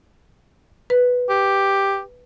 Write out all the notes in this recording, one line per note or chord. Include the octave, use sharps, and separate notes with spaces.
B4
G4